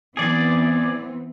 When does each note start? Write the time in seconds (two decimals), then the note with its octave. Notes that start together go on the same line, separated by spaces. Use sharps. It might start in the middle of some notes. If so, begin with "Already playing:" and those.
0.17 E3 B3 C4 G#4 D5